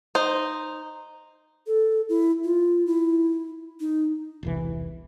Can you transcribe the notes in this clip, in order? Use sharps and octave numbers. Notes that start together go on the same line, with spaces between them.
D#4 C5
A4
E4
F4
E4
D#4
E1 C2 E3